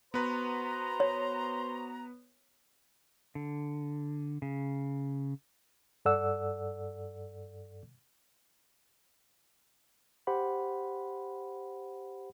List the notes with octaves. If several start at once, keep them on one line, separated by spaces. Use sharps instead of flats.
B3 F#4 B4 C5 A#5
C#5
D3
C#3
G2 A4 D5 F#5 E6
G4 C5 F#5 B5